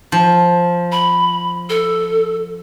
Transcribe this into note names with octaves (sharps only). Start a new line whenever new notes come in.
F3
B5
A4